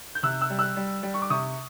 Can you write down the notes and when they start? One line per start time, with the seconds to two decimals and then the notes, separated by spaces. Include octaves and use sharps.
0.15 G6
0.23 C3 E6 F#6
0.41 E6 F#6
0.50 G3
0.59 E6 F#6
0.77 G3
1.03 G3
1.14 C#6
1.22 D6
1.30 C3 C#6 D#6